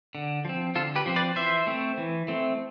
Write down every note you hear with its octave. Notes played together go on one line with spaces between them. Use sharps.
D3
F3 C4
D3 F4 A4
G4 B4
F3 C4
B4 D5
E3 C5 E5
A3 C4
E3
A3 C4